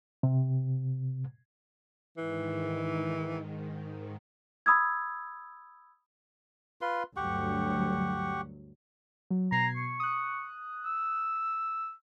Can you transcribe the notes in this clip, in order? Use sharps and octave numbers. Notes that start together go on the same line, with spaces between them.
C3
G#2 D#3 E3
B5 D#6 E6 G#6
F4 B4 C6
D2 G2 F#3 G4 F#5 C#6
F#3
B2 A#5 G#6 C7
C#6
D#6 F#6
E6